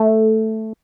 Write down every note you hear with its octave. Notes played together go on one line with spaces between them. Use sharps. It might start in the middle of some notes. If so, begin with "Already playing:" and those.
Already playing: A3